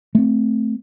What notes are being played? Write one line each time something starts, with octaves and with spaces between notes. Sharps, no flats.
A3 C4